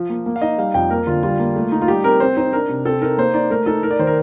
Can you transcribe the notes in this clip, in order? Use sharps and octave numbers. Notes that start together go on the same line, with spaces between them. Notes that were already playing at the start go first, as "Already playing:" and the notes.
Already playing: F3
A#3
A#3
F5
D#4 D#5
G3 F5
F2 G5
A#3 A#4
D3 F4
G3 F4
A#3
A3
D#4
F4
G3 G4
C4 A#4
C4 C5
D#4 C5
D4 A#4
C3
C4 A4
D#4 A#4
A#3 C5
D#4 D5
A3 A#4
D#4 A4
D#4 A#4
D5
D#3 C5
A#4